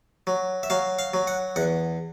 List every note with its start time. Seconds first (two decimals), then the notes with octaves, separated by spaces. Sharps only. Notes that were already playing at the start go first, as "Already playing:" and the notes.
0.27 F#3
0.63 E5
0.70 F#3 F5
0.99 F5
1.14 F#3
1.27 F#5
1.56 E2 F#5